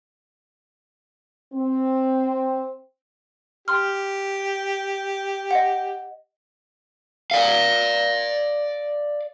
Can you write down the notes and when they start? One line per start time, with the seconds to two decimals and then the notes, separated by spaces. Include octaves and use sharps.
1.53 C4
3.68 G4 C6 F6
5.51 D#5 F#5
7.31 D5 F5